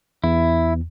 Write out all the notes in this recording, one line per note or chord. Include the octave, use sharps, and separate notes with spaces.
E2 E4